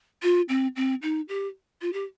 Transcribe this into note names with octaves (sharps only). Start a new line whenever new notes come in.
F4
C4
C4
D#4
G4
F4
G4